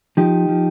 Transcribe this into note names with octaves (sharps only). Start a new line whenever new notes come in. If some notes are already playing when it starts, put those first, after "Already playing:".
F3 D#4 G4
F3